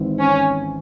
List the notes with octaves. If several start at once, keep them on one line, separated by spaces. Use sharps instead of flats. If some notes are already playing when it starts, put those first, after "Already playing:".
Already playing: G#1 G#2 E3 C4
C#4